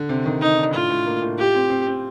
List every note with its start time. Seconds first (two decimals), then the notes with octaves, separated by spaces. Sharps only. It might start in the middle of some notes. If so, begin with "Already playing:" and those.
Already playing: D3
0.09 C3
0.26 D#3
0.41 C3 D#4
0.57 D4
0.73 A2 F4
0.90 A2
1.06 A#3
1.22 A2
1.38 F4 G4
1.55 C4
1.70 C4
1.87 C4